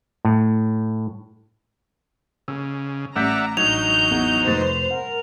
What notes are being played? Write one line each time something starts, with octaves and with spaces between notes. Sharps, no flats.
A2
C#3 E6
A1 D5 E5 F#5 A#5 G6 B6
A1 F#3 D4 D#4 G6 G#6 F7
E2 F#5
F1 B4 C5 A6
A#4 F#5